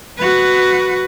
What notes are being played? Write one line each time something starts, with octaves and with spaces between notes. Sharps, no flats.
F#4 B4